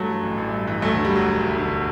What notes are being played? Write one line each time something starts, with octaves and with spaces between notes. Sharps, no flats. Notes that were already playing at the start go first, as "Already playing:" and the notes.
Already playing: G2 F#3 A3
E3
A1
A1
G2
E3
D2 F#3 A3
D3
G3
E1 F#3
E1
D2
D3